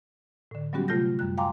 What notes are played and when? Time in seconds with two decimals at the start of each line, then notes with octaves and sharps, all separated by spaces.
0.51 A2 D3
0.73 F#3 G3 B3 C#4 F#4 G4
0.88 C3 A3 F4 A4 G6 A#6
1.19 F#2 G3 F#6
1.38 F5 G5 G#5 A#5 C6 D6